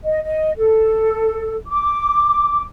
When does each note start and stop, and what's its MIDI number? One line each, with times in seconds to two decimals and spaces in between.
0.04 0.21 75
0.22 0.50 75
0.57 1.54 69
1.66 2.61 86